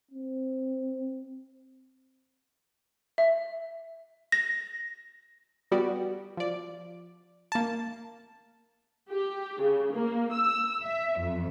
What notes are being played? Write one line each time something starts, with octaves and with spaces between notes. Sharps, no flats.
C4
E5
A#6
G3 B3 F#4 G4 D5
F3 D5
A#3 A5
G4
C#3
A#3
E6
E5
F2